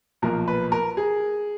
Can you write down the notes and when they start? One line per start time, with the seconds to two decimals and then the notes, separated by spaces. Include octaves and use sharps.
0.22 B1 A#2 F3 A#4
0.48 B4
0.72 A#4
0.97 G#4